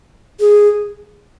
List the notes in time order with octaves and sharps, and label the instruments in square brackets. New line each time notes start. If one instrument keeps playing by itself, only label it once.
[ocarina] G#4